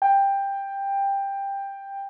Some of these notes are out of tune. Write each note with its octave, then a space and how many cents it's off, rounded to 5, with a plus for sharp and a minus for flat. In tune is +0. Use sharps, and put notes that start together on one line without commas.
G5 +15